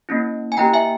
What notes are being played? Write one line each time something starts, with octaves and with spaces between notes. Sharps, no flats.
A#3 C#4 E4
G#5
A#3 E4 G4 G5 A#5
E5 G#5